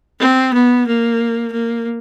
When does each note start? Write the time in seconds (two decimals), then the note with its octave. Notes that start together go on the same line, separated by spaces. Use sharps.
0.20 C4
0.54 B3
0.87 A#3
1.52 A#3